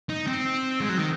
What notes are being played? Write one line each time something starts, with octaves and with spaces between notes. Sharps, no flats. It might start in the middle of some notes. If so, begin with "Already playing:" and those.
D#4
C4
G#3
F#3
D#3